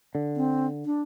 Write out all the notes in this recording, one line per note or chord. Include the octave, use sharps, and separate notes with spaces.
D3
C4
D4